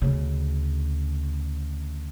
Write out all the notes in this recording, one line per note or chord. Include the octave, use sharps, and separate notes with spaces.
D2 C#3